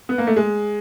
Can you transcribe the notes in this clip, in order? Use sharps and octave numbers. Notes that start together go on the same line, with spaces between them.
B3
A#3
A3
G#3